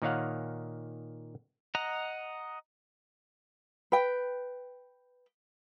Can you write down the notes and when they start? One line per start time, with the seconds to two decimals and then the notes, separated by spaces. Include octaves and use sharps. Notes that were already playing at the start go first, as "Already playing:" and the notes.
0.02 A#2 D#3 D#4 C#5 F5 F#5
1.75 D#5 F#5 A#5
3.92 B4 G5